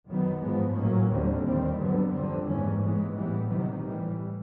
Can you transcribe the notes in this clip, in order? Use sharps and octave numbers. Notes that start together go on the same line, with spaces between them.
F#2 D#3 F#3 B3
G#2 F3 G#3 B3
A2 F#3 A#3 C#4
D#2 D3 G3 C4
D#2 D#3 G3 C4
G2 D3 F#3 B3
F2 D3 G3 C4
G#2 E3 G3 A#3 C#4
G#2 E3 G#3 B3
A2 E3 G3 B3
C3 D#3 F#3
A2 E3 G3